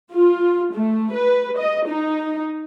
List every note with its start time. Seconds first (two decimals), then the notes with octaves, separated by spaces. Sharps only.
0.12 F4
0.73 A3
1.13 B4
1.57 D#5
1.87 D#4